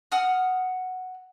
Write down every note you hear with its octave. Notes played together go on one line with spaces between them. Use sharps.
F#5 D#6 F6